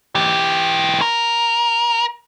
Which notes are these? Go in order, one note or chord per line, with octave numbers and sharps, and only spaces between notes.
E3 G4
A#4